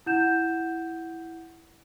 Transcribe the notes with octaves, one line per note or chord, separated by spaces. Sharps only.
E4 F#5 G6 E7